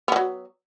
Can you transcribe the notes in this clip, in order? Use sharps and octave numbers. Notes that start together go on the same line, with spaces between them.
D#3 F#3 B3